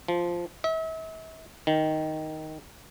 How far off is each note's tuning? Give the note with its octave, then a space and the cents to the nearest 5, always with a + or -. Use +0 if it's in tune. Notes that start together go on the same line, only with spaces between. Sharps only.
F3 -5
E5 -40
D#3 +5